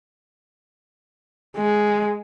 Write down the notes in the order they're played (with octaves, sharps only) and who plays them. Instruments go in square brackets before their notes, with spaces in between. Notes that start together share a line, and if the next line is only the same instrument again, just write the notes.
[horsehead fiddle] G#3